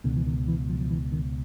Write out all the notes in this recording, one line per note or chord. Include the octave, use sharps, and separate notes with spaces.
C#2 B2 D3
E3
D#3
E3
F3
F3
E3
D#3